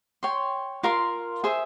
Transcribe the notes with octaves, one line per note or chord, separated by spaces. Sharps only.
C#5 G5 C6
F4 A#4 F5 C6
G#4 C5 E5